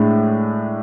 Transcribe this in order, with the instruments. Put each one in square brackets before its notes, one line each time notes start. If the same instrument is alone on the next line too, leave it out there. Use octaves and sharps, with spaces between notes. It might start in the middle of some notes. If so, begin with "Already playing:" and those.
Already playing: [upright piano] A2 G#3 D4